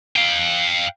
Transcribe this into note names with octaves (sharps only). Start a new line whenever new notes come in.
F5 G5